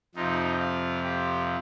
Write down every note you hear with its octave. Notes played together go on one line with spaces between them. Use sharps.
F2 C3 F3 D#4
F4
G4